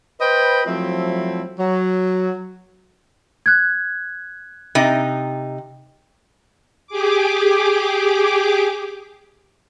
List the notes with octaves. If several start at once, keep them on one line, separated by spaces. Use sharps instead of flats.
B4 C5 D#5 G5 B5
F3 F#3 A3 C4 E4
F#3
F#6 G#6
C3 D#4
G4 G#4 D6